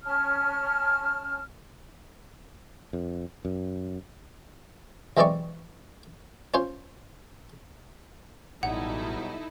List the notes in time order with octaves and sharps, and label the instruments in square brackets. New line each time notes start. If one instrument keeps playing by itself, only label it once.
[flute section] C#4 A5 F6
[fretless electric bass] F2
F#2
[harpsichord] B1 E3 G#3 C4 D5 C#6
C#4 F4 C5
[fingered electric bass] A1 [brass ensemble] B2 F#3 G3 [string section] D#4 E4 A4 [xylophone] F#5